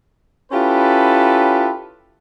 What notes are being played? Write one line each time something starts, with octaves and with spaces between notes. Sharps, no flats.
C#4 E4 F4 G4 A4 B4